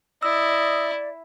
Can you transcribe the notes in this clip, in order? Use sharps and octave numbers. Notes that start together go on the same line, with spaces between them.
E4 D5 D#5 E6